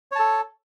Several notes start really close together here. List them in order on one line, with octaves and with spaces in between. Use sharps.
C#5 A5 A4